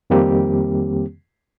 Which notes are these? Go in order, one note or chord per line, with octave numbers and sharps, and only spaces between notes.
F2 D#3 G3 A#3 C4 G4